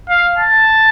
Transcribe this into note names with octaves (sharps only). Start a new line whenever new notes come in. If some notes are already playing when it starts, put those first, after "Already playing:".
F5
A5